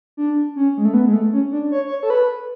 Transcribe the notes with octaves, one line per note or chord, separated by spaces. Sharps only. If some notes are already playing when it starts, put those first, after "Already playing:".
D4
C#4
G#3
A3
B3
G#3
A3
C#4
D4
C#5
C#5
A4
B4